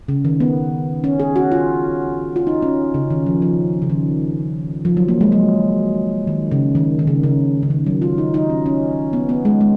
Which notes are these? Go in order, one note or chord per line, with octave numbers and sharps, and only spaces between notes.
C#3
D#3
B3
C#4
G#4
F#4
F4
F4
D#4
C#4
C#3
D#3
F3
F3
C#3
D#3
F3
F#3
A#3
G#3
F#3
D#3
C#3
D#3
D#3
C#3
C#3
C#3
D#3
F#3
F4
D#4
D#4
C#4
C#4
B3
B3
G#3
G#3